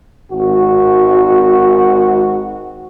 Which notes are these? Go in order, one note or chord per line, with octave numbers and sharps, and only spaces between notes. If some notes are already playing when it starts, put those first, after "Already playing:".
G#1 F#4